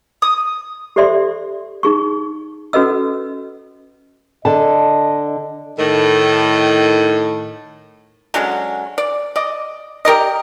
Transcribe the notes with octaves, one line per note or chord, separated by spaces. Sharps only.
D#6
G4 A4 C5 D5 E5 C6
D#4 G#4 C#6
C#4 F#4 A4 B4 D#5 E6
D3 D#5 A5
A2 D#3
D3 F#3 G#3 C#4
D5
D5 D#5
G4 A#4 D5 D#5